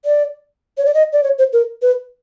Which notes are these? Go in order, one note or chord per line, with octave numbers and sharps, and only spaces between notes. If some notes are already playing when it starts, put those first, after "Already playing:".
D5
C#5
D5
D#5
D5
C#5
C5
A#4
B4